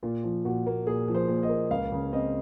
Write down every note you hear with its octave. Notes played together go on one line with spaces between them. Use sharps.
A#2 F4
F3
A#2 F#4
A#3
A#2 G#4
F3
C5
A#2
D#5
A#3
C#2 F5
C#3
C4 D#5